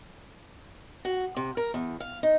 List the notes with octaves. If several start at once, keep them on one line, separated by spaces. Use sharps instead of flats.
F#4
C3
A#4
E2
F5
D#4